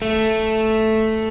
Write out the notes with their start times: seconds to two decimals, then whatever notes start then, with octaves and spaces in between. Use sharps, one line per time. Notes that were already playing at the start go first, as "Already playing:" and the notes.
0.02 A3